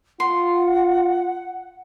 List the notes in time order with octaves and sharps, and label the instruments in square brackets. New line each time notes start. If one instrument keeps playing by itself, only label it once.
[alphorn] F4 [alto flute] F#5 [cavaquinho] C6